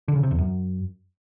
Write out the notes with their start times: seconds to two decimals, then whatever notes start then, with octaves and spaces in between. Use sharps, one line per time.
0.08 D3
0.16 C#3
0.23 C3
0.31 E2
0.38 F#2